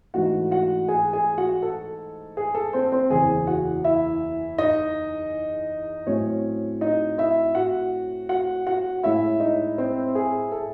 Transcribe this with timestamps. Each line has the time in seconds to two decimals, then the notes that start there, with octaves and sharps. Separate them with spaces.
0.14 G#2 E3 A3 D#4 F#4 F#5
0.51 F#4 F#5
0.88 G#4 G#5
1.13 G#4 G#5
1.38 F#4 F#5
1.62 A4
2.37 G#4
2.55 A4
2.73 C4 C5
2.92 C4 C5
3.10 F#1 E2 C#3 G#4 G#5
3.47 F#4 F#5
3.84 E4 E5
4.58 D#4 D#5
6.07 A2 F#3 A3 C4 C#4 C#5
6.81 D#4 D#5
7.18 E4 E5
7.55 F#4 F#5
8.29 F#4 F#5
8.67 F#4 F#5
9.03 A2 G#3 C#4 E4 E5
9.40 D#4 D#5
9.78 C4 C5
10.15 G#4
10.52 A4